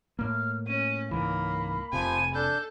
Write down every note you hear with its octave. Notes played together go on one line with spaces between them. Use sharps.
A2 A#3 F6
C#4 D#7
C#2 G#2 E3 A#3 B5
F1 C3 F3 G#5
D4 A4 G6